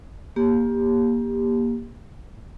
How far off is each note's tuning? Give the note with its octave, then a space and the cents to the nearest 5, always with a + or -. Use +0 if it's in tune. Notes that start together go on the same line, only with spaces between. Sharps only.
A#3 +25 G4 +15